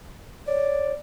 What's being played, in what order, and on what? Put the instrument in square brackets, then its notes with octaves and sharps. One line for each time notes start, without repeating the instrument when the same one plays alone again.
[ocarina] C#5 [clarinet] D5